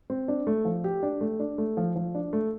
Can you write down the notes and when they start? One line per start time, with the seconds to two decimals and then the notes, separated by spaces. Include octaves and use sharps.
0.10 C4
0.28 D4
0.47 A3
0.65 F3
0.84 G4
1.03 D4
1.21 A3
1.40 D4
1.58 A3
1.77 F3
1.96 F3
2.15 D4
2.33 A3